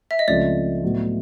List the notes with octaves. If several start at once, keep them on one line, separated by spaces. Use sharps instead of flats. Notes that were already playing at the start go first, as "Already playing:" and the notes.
E5
D#5
C#2 C#3 F3 A3 C4 D5
A2 F#3 B3